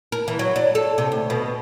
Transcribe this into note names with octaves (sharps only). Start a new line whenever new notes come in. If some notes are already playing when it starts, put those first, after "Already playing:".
A#4
E3
F#3
D4
A4
C3
D2
B2